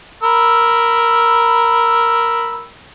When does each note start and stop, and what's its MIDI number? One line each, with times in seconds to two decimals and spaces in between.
0.23 2.66 70
0.23 2.66 83
0.23 2.66 88